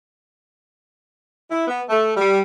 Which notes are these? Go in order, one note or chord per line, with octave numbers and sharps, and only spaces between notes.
E4
B3
A3
G3